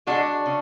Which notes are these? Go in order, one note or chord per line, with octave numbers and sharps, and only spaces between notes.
D3 G#3 D4 F#4
C#3